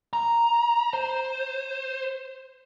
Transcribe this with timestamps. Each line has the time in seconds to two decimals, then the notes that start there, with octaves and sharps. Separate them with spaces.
0.13 A#5
0.93 C5